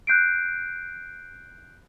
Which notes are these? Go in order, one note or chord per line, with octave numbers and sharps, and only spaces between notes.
F#6 G6 C7 D7